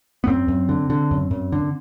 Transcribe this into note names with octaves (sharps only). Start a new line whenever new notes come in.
B3
F#2 C4
F#2
D3
D3
F#2
F#2
D3